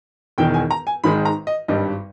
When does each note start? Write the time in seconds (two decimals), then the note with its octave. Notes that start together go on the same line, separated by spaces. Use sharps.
0.38 E1 E2 D#3 G5
0.54 G#5
0.71 A#5
0.87 G#5
1.04 G#1 G#2 D#3 G#3 B5
1.25 A#5
1.47 D#5
1.68 G#1 G2 G3 D#5